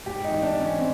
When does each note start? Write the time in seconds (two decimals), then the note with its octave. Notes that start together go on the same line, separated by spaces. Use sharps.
0.06 G#2 G4
0.25 D#4
0.31 E3
0.42 D4
0.55 E3
0.60 C#4
0.79 C4